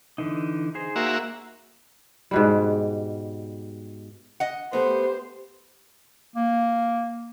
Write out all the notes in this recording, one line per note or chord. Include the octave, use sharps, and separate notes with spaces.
D3 E3 D#4
D#4 G#4 C5
A#3 F#4 E5
G#2 B2 G3
D#5 F#5
A3 B3 G4 C5
A#3